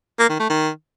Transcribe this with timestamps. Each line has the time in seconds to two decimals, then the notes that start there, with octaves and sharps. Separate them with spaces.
0.19 A#3
0.29 D#3
0.39 A3
0.49 D#3